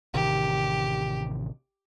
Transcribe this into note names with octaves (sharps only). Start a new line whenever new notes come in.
A1 C3 D#3 G4